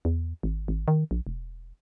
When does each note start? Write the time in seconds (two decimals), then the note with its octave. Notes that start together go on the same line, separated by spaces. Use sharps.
0.05 E2
0.43 G#1
0.68 G#1
0.88 D#3
1.11 A#1
1.27 E1